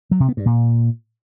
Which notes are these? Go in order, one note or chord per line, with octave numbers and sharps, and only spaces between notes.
F#3
C3
B3
G2
A#2